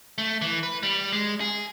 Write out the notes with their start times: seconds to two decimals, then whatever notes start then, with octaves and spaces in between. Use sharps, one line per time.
0.18 A3
0.42 E3
0.63 B4
0.83 G3
1.12 G#3
1.40 G#4